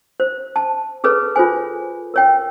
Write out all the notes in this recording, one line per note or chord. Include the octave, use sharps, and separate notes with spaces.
C5
A5
G#4 A4 B4 C#5
F4 A4 C5 G#5
A#4 C#5 G5